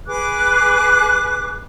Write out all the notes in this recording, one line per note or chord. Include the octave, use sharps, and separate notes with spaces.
G#4 B4 D6 F#6